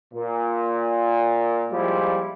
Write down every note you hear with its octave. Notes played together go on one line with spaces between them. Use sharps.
A#2
A#2 F3 G3 G#3 E4 F4